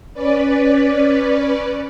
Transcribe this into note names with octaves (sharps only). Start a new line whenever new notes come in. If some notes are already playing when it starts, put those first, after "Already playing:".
C#4 B4 D5